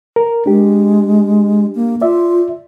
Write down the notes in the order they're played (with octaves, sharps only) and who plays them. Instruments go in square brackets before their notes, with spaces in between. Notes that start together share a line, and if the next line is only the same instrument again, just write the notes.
[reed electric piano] A#4
[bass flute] G#3 [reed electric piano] D4 G4
[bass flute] A#3
[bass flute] F4 [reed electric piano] D5 E5